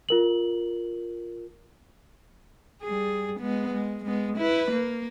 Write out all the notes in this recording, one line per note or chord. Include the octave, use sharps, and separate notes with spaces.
F4 A#4 F#7
G3 G#4
G#3 B3
G#3
G#3 B3
E4 B4
A#3